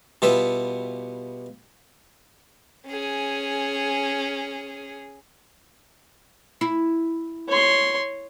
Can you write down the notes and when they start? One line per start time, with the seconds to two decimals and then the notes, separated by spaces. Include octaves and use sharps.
0.22 B2 G3 B3 F4 E5
2.88 C#4 G#4
6.61 E4
7.49 C#5 C6